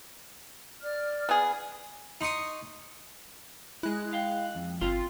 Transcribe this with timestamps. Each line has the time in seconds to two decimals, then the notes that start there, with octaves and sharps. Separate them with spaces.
0.82 D5 F6
1.29 B3 G#4
2.21 D#4 C6 C#6 D#6
3.83 G#3 E4 F#6
4.13 F5 G5
4.55 F2
4.81 G1 C4 F4 A#5 C6